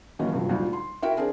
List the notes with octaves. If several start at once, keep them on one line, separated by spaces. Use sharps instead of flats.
D#1 D#2 E3 F#3 C#4 D#5
G2 C3 F3 F#3
D2 A#2 G3 D#4
C6
E4 F#4 A#4 E5 G5
C4 D4 G#4 A#4